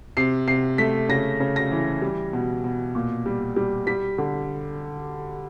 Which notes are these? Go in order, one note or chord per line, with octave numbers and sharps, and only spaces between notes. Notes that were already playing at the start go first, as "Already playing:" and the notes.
C3 C7
C3 C7
A3 B6
C#3 A#6
C#3
A#6
E3
G3
B2
B2
A#2
G3
G3
G3 B6
D3